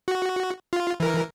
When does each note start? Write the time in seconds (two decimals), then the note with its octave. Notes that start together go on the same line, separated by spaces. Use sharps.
0.08 F#4
0.73 F4
1.00 E3 A#4